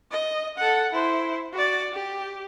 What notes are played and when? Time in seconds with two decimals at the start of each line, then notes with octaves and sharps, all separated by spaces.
0.11 D#5
0.58 A4 F#5
0.93 E4 C5
1.53 F#4 D5
1.93 G4